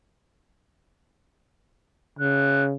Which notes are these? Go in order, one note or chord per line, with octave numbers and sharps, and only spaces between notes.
C#3 F#6